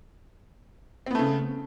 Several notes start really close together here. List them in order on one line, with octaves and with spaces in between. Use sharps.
C4 B3 A3 C#3